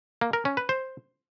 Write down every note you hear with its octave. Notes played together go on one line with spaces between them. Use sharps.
A#3
A#4
C#4
B4
C5